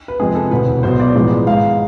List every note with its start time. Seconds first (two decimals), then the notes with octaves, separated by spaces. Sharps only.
0.08 B4
0.20 F2 C3 G#3 G#4
0.35 A4
0.51 E1 D2 C3 B4
0.83 B1 B2 B3 C5
1.00 D5
1.15 A1 G#2 F3 G#3 B3
1.47 G#1 G#2 G#3 F5